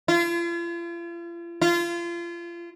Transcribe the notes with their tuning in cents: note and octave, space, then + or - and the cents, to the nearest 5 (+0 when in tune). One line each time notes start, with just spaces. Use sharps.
F4 -40
F4 -30